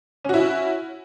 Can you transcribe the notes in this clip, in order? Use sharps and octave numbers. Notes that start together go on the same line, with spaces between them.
C#4 E4 F#4